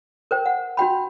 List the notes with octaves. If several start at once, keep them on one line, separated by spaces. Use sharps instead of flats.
A#4 C5 G5
F#5
D4 F#4 G5 B5